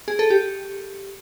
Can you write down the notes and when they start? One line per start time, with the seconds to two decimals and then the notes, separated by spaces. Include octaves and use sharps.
0.08 G#4
0.19 A4
0.30 G4